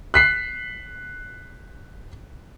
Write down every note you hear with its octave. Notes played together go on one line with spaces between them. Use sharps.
F#6 B6 C7